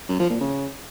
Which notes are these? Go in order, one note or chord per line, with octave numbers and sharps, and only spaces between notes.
F#2
F3
A#2
C#3